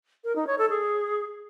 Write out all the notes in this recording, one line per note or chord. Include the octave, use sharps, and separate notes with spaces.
A#4
D#4
C#5
A4
G#4